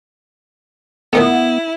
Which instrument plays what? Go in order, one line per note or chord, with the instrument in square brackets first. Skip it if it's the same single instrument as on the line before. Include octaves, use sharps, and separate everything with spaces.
[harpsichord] A#2 D#3 A3 [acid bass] B3 [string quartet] E4